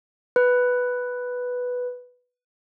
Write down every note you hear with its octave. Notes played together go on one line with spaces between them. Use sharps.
B4